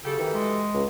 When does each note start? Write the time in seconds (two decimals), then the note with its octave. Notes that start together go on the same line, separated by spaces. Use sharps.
0.04 F#2 C#3 G4 A4
0.19 D#3 E3
0.34 G#3
0.74 C#2